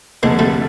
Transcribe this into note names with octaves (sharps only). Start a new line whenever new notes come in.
F1 F2 D3 G#3 A#3
G3 A3